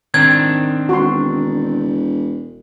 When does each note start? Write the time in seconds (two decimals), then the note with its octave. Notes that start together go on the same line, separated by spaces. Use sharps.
0.14 D#3 C4 D4 G#6
0.89 E1 F#4 C6